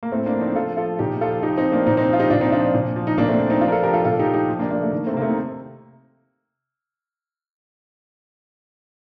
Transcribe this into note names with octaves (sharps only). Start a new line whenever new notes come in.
A#3
A2 A3 C4
A#3 D4
F3
C4 D#4
F3 F4 A4
F3 F4 A4
A#2 D#4 G4
G4
F3 F4 A4
F3 D#4 G4
C4 D#4
F3
A#3 D4
A#2 C4 D#4
C4 D#4
F3 F4
D#4 G4
A#2 D4 F4
C4 D#4
F3 D4 F4
A#2
F3
D#4
A#2 A#3 D4
A3 C4
F3
C4 D#4
F3 D4 F4
A#4
F4 A4
F3 G4 A#4
F4 A4
A#2 F4 A4
D#4 G4
F3
D#4 G4
F3
A#3 D4
F3 A#3 D4
A3
D#3 A#3
A3 C4
C3 A#3
A3 C4
D#4